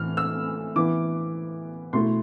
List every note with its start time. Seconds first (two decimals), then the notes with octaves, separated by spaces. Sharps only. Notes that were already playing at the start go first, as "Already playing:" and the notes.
Already playing: A2 E3 A3 F6
0.17 E6
0.76 E3 B3 E4 D6
1.93 B2 A3 E4 C6